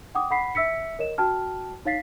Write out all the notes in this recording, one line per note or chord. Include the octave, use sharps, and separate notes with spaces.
F#5 G5 D6 D#6
F#5 B5 B6 C7
E5 E6 B6 C#7
A#4 C#5 D#5 E7
F#4 G5 A5 F6
D#4 C#5 F5 A6 B6 C7